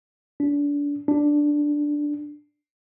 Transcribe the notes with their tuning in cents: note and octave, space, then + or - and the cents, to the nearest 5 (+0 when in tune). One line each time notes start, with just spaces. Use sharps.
D4 -30
D4 +0